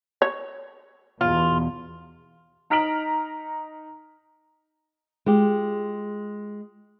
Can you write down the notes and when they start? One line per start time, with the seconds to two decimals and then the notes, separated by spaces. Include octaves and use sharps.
0.22 C#5
1.21 E2 B2 F4
2.70 D#4 A#5 F6 B6 D7 F#7
5.26 G#3 F4 G4